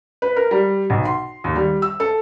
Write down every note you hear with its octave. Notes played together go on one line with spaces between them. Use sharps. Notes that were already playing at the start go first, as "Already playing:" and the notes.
B4
A#4
G3
B1
C6
D#2
G3
E6
A4